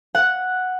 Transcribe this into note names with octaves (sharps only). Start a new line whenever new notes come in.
F#5